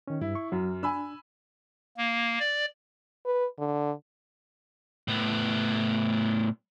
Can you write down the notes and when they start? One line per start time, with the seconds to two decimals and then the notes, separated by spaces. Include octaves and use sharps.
0.07 D#3 C#4
0.21 G2 E4
0.35 C#6
0.52 F#2 F#3
0.83 D4 G#5 B5 E6
1.97 A#3
2.39 D5
3.25 B4
3.59 D3
5.08 A2 B3